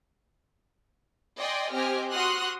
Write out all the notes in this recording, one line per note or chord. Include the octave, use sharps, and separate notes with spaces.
D5 D#5 G5 G#5 C6
C4 G4 D#5 G#5 F6
F#4 C6 D#6 F6 F#6